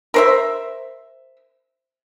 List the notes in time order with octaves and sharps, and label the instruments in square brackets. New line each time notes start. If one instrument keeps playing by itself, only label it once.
[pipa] A#4 C5 E5